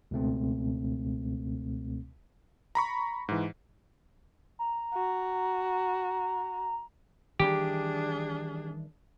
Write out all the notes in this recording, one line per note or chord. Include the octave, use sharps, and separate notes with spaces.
C#2 B2 A3 C4
A#5 B5 C#6
G#2 E3
A#5
F#4
D#3 E3 G3 D4 G4 G#4